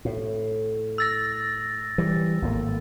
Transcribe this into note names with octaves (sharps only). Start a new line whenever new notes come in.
A2
E6 A6 A#6
E3 G3
G#1 A2 A#3